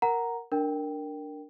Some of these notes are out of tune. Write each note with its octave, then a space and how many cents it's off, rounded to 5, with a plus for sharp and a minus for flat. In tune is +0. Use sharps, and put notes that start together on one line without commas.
A#4 +0 F#5 +5 A#5 +0
D4 +0 A#4 -5 G5 +0